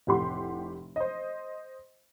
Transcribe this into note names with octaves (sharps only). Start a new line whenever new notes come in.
F1 A2 G4 F#5 C6
C5 D#5